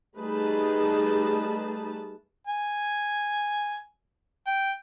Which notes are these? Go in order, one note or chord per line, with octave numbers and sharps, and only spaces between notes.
G3 A3 D#4 G#4 B4 A5
G#5
G5